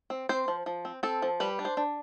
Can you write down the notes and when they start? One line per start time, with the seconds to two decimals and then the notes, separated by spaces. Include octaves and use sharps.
0.10 C4
0.29 C4 C5
0.48 F3
0.66 F3
0.85 C4
1.03 C4 A4
1.22 F3
1.40 G3 B4
1.59 D4
1.65 C5
1.77 D4